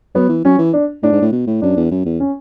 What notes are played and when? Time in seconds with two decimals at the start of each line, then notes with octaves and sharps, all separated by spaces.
0.15 F#3 B3
0.29 E3
0.45 F#3 C#4
0.58 E3
0.73 D4
1.03 A2 D4
1.12 G#2
1.22 A2
1.32 B2
1.47 A2
1.62 F#2 D4
1.77 E2
1.91 F#2
2.05 E2
2.20 C#4